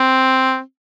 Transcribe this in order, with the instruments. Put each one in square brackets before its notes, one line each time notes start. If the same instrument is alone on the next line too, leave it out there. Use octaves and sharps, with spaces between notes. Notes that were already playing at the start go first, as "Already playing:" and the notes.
Already playing: [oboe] C4